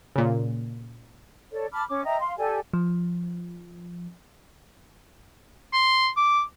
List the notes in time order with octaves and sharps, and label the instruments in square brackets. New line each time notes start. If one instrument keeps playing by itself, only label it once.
[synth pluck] A#2 C#3
[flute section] A4 C#5 D5
A5 B5 D6 F6
C#4 D6
D#5 E5 G5 A#5
F5 C6
G4 A4 D5 G#5
[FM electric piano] F3
[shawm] C6
D6